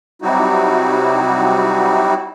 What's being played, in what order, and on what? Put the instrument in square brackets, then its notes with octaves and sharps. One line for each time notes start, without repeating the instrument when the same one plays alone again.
[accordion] C3 F#3 G3 D#4 E4 F#4